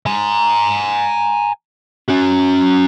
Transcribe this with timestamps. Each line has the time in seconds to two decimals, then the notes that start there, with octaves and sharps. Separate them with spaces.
0.06 G#5 A#5
2.09 C#4 F#4